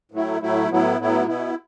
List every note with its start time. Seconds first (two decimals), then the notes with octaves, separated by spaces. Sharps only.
0.12 A2 F#3 A3 E4
0.41 A2 F#3 A3 E4
0.69 A2 F#3 B3 E4
0.98 A2 F#3 B3 E4
1.27 B2 B3 E4